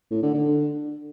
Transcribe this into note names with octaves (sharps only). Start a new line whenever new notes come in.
A2
D3
D3